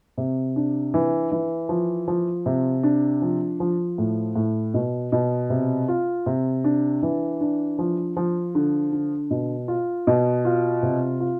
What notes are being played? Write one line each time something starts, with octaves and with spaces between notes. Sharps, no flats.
C3
D4
E3
E3
F3
F3
C3
D4
F3
F3
A2
A2
B2
B2
C3
F4
C3
D4
E3
D4
F3
F3
D3
D3
B2
F4
B2
F4
C3
F4